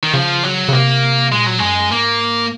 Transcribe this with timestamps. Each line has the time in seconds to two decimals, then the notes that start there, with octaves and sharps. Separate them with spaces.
0.03 D#3
0.13 C#3 F3
0.43 F#3
0.68 C#3
0.73 C3 A#3
1.32 A#2 G#3
1.46 F#3
1.59 F#2 G#3
1.92 G#2 A#3